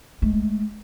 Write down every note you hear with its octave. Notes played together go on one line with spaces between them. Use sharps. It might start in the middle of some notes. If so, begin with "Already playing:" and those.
G#3 A3